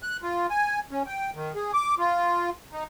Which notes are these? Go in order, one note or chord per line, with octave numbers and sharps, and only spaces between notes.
F#6
F4
G#5
C#4
G5
D#3
G#4
D6
F4
D#4